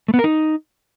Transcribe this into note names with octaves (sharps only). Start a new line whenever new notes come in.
A3
B3
A#4
D#4